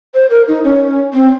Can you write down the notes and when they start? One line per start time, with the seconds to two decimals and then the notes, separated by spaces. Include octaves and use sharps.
0.14 C5
0.30 A#4
0.48 D#4
0.64 C#4
1.14 C4